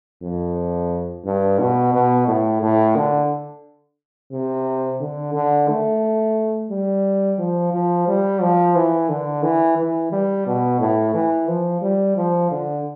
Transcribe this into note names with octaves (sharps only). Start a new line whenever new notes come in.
F2
G2
B2
B2
A2
A2
D3
C3
D3
D3
A3
G3
F3
F3
G3
F3
E3
D3
E3
E3
G3
B2
A2
E3
F3
G3
F3
D3